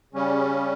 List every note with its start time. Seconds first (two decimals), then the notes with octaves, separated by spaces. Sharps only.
0.13 C#3 G3 C#4